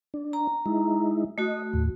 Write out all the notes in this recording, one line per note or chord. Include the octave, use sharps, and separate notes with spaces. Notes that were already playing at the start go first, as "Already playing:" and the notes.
D4
A#5
G#3 D#4 E4
A3 F#4 D#5
D#2 A2